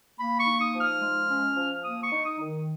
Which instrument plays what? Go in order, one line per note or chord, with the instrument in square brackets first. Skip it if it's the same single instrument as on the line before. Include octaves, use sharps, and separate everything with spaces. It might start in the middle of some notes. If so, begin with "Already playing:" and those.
[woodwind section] A#3 B5
C#6
D#4
D#6
F3
F6
G#3
C#4
F3
A#3 D#6
C#6
D#4
D#6
D#3